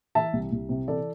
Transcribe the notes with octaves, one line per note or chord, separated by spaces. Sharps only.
E3 E5 A5
C2
C2
C3
E3 A4 D5